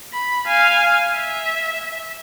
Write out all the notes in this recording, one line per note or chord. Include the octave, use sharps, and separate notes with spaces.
B5
F5 G#5
E5